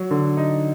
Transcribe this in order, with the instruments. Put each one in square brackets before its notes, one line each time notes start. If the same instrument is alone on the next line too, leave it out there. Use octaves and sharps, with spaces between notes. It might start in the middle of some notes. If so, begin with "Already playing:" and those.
Already playing: [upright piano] F#3
D3
D#4